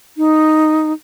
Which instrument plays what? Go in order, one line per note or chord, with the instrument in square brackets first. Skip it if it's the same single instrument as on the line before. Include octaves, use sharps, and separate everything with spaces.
[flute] D#4